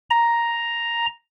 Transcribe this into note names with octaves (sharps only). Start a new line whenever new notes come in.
A#5